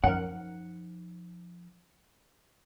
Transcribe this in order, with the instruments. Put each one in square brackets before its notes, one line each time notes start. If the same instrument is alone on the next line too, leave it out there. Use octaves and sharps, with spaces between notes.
[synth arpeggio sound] F#2 A#4 [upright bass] F3 D#4 [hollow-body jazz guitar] F#5